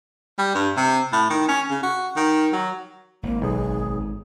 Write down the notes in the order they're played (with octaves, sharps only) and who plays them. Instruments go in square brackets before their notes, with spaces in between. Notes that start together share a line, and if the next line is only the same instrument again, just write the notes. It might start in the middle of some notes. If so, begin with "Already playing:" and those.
[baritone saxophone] G3
G2
C3
A2
D#3
C#4
C#3
F#4
D#3
F#3
[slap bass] G#1 [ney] A#3
[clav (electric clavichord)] B1 [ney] G#4